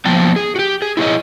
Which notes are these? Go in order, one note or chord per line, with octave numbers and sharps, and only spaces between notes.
F3 A#3 B3 G5 A5
G#4
F#4 G4
G#4
E4 G#4 C#5 D#5